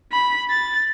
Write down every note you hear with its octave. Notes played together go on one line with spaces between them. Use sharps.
B5
A6